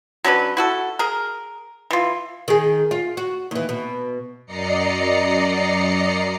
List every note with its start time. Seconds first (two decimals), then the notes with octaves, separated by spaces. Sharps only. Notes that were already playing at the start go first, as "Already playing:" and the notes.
0.24 F#3 C#4 D4 B4
0.57 E4 F#4 A4
0.99 G#4 A#4
1.91 E3 F4
2.48 D#3 G#4
2.91 F4
3.17 F#4
3.51 D#2 E3
3.69 B2
4.46 F#2 D5 D#5 A#5 C7 C#7